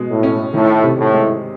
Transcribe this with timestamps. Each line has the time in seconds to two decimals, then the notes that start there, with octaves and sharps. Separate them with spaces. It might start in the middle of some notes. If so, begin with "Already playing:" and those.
Already playing: B2 G#3
0.09 A2
0.23 C#4
0.54 A2 D#3
0.83 C3
0.98 A2
1.13 G#3